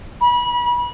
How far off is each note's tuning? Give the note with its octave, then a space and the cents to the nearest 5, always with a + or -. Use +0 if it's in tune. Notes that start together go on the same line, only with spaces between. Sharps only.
B5 -30